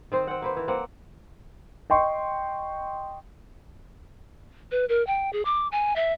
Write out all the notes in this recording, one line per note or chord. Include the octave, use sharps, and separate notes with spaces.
D#3 C4 C5
C4 F#5
A#3 B4 C5
E3
A#3 C4 F#5
D#5 G5 C6 C#6
B4
A#4
G5
G#4
D6
G#5
E5